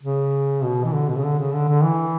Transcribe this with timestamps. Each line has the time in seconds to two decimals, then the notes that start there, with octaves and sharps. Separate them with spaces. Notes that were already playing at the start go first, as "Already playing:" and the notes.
0.03 C#3
0.63 B2
0.85 E3
0.94 D3
1.09 B2
1.16 C#3
1.23 D3
1.39 C#3
1.54 D3
1.68 D3
1.83 E3